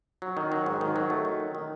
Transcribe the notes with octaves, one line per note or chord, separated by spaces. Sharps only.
F#3
D#3
F#3
G#2
D#3
F#3
A3
D#3
F#3
D#3